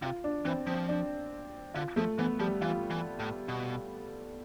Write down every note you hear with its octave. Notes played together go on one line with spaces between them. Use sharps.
C3 F4
D4
E3 C4
F3 C4
D4
D3 F4
F3 A3
E3 B3
F3 G3
E3 F4
E3
A2
B2